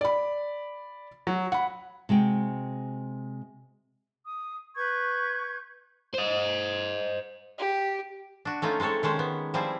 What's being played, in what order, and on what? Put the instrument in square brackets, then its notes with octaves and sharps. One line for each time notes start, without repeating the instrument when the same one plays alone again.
[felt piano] D5 B5
F#3
F#5 B5
[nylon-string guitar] C3 G#3 F#4 G5
[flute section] D#6
B4 C#6 G6 G#6
[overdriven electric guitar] C5 D#5
[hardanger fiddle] G4
[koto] D4 F#4
A3 C#4 D#4 F4
G#3 A3 C4 A4 C#5
D#3 G#3 C#4 C5
B3
F3 G3 C4 E4 G#4 C5